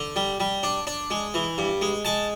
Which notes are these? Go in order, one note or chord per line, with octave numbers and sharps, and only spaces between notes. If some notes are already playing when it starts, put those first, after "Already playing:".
Already playing: D3
G3
G3
D4
D4
G#3
E3
G2
G#3
G#3 A5